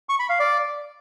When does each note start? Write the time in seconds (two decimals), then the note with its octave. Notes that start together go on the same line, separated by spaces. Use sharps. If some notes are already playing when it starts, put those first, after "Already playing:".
0.09 C#6
0.19 B5
0.29 F5
0.40 D5